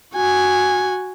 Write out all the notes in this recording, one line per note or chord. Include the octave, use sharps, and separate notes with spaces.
F#4 G#5